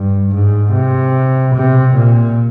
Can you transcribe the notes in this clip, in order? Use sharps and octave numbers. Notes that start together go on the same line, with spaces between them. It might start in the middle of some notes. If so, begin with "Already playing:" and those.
Already playing: G2
G#2
C3
C3
A#2